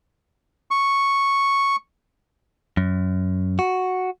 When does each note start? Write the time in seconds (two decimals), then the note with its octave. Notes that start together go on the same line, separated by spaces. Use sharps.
0.71 C#6
2.77 F#2
3.59 F#4